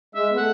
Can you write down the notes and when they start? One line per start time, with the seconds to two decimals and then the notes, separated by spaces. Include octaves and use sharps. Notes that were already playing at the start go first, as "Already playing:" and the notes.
0.15 G#3 E5
0.31 B3
0.36 A3 F#5